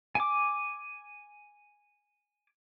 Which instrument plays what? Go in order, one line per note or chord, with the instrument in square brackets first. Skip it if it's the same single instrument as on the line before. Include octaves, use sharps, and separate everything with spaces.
[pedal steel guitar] G#5 D6